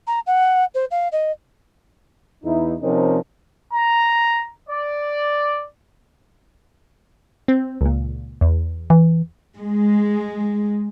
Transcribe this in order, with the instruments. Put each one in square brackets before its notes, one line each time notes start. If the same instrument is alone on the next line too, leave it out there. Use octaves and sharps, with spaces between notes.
[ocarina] A#5
F#5
C5
F5
D#5
[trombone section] E2 D#4 E4
C3 F3 C4 C#4 D#4 A#4
[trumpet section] A#5
D5
[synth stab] C4
C#2 A#2
E2
[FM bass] E3
[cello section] G#3